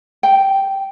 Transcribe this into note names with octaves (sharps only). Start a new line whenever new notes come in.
G5